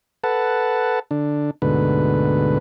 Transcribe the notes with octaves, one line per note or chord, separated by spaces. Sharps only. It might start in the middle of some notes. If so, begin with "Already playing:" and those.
A4 B4 F#5 A5
D3 D4
D2 G#2 B2 D3 B4